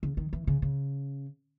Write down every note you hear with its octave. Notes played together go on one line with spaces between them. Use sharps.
C#3
D#3
E3
C#3
C#3